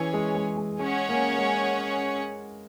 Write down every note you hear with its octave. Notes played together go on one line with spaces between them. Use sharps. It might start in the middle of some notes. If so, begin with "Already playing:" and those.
Already playing: E3 C#4 G#4 C#5
G#3
G#3
G#3
G#3 C#4 G#4 C#5 F#5
A#3
G#3